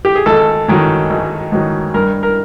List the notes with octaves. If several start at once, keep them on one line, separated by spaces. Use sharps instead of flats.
G4
G#4
G#1 A4
G#2 D#3 F#3
G#1
G#2 D#3 F#3
G2 A#4
A#4